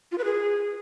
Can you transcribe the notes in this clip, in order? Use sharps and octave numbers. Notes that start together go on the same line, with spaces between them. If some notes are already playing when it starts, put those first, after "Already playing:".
F4
B4
G#4